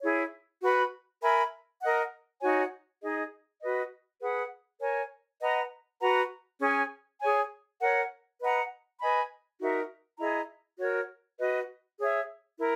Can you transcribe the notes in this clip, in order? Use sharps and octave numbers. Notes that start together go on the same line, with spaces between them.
E4 G#4 C#5
F#4 B4 F#5 B5
A#4 E5 G#5 B5
A#4 D#5 F#5
D#4 F#4 C#5 G#5
D#4 G#4 D#5
F#4 B4 D#5
G#4 B4 F#5
A#4 C#5 G#5
B4 D#5 F#5 A#5
F#4 B4 F#5 A#5
C#4 G#4 C#5 G#5
G#4 C#5 G#5
A#4 C#5 F#5
B4 D#5 F#5 A#5
B4 D#5 G#5 B5
D#4 F#4 A#4 E5
E4 G#4 D#5 A#5
F#4 A#4 C#5
F#4 B4 D#5
G#4 C#5 E5
E4 A#4